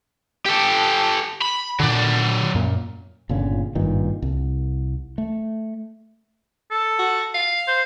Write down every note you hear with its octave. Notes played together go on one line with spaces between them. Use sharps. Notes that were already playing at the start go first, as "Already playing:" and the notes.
G4 A4
B5
A#2 D3 F#3 D5
F#2 A#2
G1 A#2 C#3
G#1 G2 A#2 D#3
C2
A3
A4
F#4
F5
C5